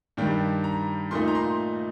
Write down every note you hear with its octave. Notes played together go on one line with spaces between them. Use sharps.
G2 D#3 G3 G5
A#5
A#2 A3 D#4 C6
A#5
C6